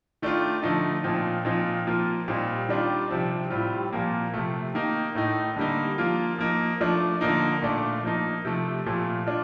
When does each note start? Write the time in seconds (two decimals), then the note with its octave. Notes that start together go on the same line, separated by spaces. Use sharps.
0.22 D#3 A3 D4 F4
0.63 D3 F3 A3 D#4
1.04 A#2 F3 C4 D#4
1.45 A#2 F3 C4 D#4
1.87 F3 A#3 F4
2.28 A#2 G3 C4 D#4
2.69 D#3 G3 D4 F4
3.10 C3 F3 C4
3.50 A2 G3 C4 F4
3.93 A#2 F3 A#3
4.34 C3 F3 A3
4.75 D#3 A#3 D#4
5.15 A2 A3 D#4
5.56 D3 G3 A#3 D#4
5.98 F3 A#3 F4
6.39 F3 A#3 D#4
6.80 F3 A3 D4 F4
7.21 D3 F3 A#3 D#4
7.62 A#2 A3 D4
8.03 F3 A#3 D#4
8.45 C3 F3 A3
8.86 A#2 F3 A3
9.27 D4 F4